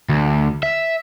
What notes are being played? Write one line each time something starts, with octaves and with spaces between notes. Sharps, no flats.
D2
E5